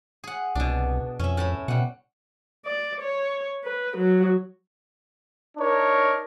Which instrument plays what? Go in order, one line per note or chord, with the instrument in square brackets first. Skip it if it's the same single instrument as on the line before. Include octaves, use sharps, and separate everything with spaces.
[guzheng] G#4 F#5
[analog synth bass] C2 [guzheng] B2 D4
[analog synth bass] F2 [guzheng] C#4 E5
[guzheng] A2 A5 B5
[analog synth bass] B2 [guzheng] G3 F#5
[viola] D5
C#5
B4
F#3
[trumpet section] D4 D#4 A#4 C#5